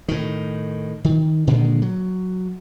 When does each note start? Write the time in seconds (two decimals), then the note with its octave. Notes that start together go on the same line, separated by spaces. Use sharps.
0.08 A2 D#3
1.05 D#3
1.47 A#2 D3 D#3 G#3
1.82 F#3